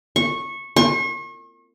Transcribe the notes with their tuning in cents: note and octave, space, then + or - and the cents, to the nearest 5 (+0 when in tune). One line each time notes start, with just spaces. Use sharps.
C#6 -15
C#6 -40